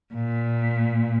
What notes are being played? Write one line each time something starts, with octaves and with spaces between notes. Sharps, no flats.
A#2